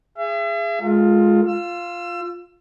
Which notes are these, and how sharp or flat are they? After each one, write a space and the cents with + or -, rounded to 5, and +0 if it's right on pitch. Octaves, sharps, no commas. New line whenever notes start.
G#4 -5 E5 +40
G#3 +15 F4 +10 A#4 -45
F4 +0 E6 +30